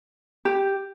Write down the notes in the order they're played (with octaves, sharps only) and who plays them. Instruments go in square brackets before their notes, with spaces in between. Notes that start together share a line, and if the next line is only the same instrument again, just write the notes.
[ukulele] G4